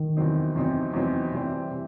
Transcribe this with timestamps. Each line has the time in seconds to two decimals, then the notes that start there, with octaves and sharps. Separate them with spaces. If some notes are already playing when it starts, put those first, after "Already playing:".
Already playing: D#3
0.17 E2 C3 F#3 C4 D#4
0.55 E2 C3 F#3 C4 D#4
0.93 E2 C3 F#3 C4 D#4
1.32 C3 E3 G3 C4
1.71 C3 E3